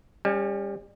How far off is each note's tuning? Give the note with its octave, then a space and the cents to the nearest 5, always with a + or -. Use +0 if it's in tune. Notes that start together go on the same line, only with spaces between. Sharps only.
G3 +30 C#4 +0